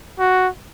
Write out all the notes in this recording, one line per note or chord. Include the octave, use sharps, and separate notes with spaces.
F#4